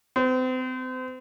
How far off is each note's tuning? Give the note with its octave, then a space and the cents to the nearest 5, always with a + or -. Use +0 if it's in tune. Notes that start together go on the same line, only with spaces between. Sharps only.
C4 -35